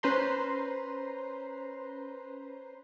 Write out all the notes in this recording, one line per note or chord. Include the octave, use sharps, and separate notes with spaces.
C#4 B4 C5 A#5 C6